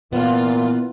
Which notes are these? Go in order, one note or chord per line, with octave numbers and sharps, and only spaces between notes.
A#2 E3 B3 F4